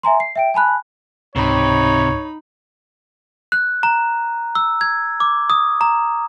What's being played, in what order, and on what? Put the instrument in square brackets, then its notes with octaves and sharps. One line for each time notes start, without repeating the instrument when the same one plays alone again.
[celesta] E5 G#5 A#5 C6
C7
E5 G5 D7
G#5 A5 B5 F#6
[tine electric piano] C#2 G#2 [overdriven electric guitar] C3 [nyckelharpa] D#4 B5 [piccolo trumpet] C#5
[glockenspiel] F#6
A#5
E6
G#6
D6
D#6
A#5